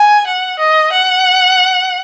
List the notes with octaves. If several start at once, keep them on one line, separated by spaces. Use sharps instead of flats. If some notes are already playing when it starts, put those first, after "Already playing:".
Already playing: G#5
F#5
D#5
F#5